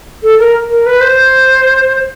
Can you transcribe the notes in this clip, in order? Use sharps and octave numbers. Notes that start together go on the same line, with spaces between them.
A4
A#4
A#4
B4
C5